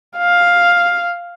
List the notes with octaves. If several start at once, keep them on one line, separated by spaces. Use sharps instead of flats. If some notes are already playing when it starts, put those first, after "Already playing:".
F5